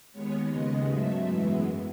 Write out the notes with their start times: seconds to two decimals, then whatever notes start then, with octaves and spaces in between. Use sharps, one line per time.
0.13 D#2 D#3 G#3 B3 C#5
0.50 D#2 C#3 G#3 B3 D#5
0.88 G#2 F#3 A3 E5
1.27 F#2 E3 G#3 B3